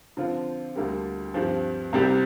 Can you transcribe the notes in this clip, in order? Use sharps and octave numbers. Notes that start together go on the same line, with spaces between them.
D3 F3 C4 F4
D2 D3 G3 A#3 G4
G2 F3 C4 G4
C2 C3 G3 C4 G4